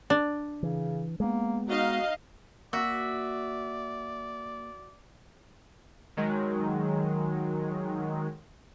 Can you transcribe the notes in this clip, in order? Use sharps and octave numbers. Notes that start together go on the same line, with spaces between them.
D4
C#3 E3
G#3 A#3 B3
D#4 F#4 D#5 F5
A#3 F#4 D5 E5
D#3 F#3 G#3